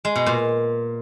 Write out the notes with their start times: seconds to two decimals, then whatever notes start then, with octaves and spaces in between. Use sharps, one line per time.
0.05 G#3
0.16 B2
0.26 A#2